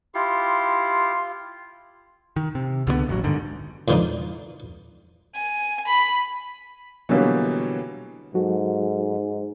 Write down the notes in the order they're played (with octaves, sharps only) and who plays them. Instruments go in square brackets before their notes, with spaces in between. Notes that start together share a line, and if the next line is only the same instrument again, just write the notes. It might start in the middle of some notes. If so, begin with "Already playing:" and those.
[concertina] E4 G4 [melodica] F4 [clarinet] C6
[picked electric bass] D#3
C3
C#2 D3 G#3 B3
D#1 A1 F#3
G1 G#2 D3 D#3
[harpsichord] E2 G#2 D3 F3 D4 D#4
[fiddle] G#5
B5
[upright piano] B2 D3 E3 F#3 G3 A#3
[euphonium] G#2 [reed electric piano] F#3 F#4 A4